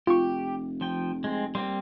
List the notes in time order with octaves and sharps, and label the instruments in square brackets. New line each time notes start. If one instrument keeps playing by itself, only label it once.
[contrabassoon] F1 [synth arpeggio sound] F4 C#6 [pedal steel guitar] G4
[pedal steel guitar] F3 G5
G#3 C4
[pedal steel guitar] G3 A#3 C4 [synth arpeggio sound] C6